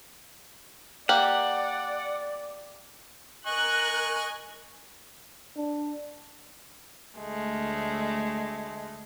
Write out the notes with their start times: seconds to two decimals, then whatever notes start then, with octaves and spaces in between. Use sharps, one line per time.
1.09 A#3 G4 D5 F#5
3.46 A#4 D#5 G#5 C#6 F#6
5.56 D4
7.16 D2 G#3 A3